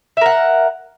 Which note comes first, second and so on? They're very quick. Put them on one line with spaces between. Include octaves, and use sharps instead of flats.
E5 A#4 F#5